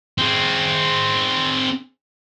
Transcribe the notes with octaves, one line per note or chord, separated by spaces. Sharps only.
C4 G#4